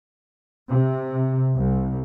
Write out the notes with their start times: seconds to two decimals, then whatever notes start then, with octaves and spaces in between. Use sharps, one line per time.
0.69 C3
1.56 C2